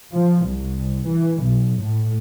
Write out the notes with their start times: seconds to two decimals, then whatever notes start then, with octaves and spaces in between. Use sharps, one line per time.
0.12 F3
0.45 C2
1.06 E3
1.42 B1
1.80 A2